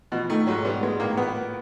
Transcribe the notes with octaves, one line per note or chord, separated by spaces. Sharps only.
B2 F3
D#3 A3
G#2 F#3
G3 B3
G#3 B3
A2 A#3
F3 B3
A#3